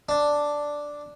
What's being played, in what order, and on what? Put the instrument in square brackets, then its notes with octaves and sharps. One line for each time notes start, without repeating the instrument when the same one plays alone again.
[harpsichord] D4